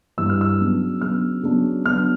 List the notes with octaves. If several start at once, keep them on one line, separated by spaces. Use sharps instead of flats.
G2 E3 G3 E6
F6
E6
C#3 F#3 B3 D4
C#3 F#3 B3 D4 F6
C#3 F#3 B3 D4
C#3 F#3 B3 D4 F6